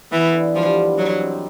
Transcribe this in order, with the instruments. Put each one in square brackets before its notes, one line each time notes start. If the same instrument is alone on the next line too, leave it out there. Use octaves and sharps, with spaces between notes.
[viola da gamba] E3 [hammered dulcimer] B3
[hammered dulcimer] D3
[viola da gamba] F3 [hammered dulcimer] G3
[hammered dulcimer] D3
[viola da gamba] F#3 [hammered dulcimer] D#4
[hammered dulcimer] C4